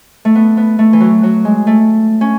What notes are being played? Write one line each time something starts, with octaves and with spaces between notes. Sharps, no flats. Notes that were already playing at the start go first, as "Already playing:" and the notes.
A3
B3
B3
A3
E3
F#3
F#3
G#3
A3
C#4